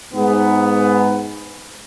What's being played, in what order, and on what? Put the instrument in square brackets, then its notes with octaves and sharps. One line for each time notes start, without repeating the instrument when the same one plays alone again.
[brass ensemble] G#2 B3